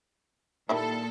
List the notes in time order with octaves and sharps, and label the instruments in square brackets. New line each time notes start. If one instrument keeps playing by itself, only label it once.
[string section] A#2 A4 [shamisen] D#3 G3 E4